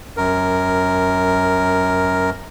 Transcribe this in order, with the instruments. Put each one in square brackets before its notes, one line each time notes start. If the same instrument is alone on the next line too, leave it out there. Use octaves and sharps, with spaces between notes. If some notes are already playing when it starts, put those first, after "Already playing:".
[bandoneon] F#2 A#4